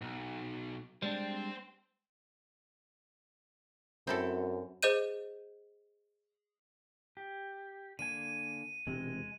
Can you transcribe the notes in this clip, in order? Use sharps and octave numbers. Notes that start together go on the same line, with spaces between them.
B1
G3 G#3 D4 C5 G5
F#2 C4 E4 A4
G#4 C5 D#5 G6 D#7
G4
D3 A#3 G#5 D#7
E1 C3 G#3